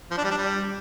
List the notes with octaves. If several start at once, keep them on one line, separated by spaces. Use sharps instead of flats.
F3
D4
G3
D4
G3